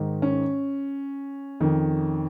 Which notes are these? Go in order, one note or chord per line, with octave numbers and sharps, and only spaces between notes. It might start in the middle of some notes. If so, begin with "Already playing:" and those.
Already playing: G#2 D#3
C#4
F2 D#3